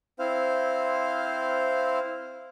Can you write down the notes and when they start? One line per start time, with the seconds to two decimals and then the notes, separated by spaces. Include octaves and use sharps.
0.19 C4 E4 C5 F5